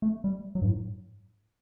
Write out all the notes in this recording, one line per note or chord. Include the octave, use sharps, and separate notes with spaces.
A3
G3
F#3
G2
A2